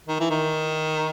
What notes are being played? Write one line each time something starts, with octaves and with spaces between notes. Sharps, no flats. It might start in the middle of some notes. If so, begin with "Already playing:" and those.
D#3
E3
D#3